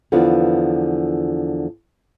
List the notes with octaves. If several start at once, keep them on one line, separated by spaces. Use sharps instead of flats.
E2 D3 F3 F4 B4